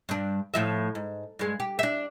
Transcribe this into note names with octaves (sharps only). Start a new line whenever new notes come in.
G2 D4
A2 F3 E5
G#2
G2 G#3
G4
D4 E5